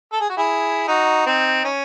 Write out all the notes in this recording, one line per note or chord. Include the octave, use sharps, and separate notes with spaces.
A4
G#4
F#4
E4 G#4
D#4 F#4
C4 D#4
C#4